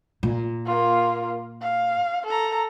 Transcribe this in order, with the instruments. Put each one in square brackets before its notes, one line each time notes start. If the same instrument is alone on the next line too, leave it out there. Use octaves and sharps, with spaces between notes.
[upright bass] A#2
[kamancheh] A#3 F4
F5
A4 A#5